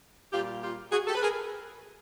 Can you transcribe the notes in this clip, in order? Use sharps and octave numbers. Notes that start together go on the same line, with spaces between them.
A#2 G3 F4 G4
F4 G4
F#4 G#4
G4 A4
B4
G#4 A#4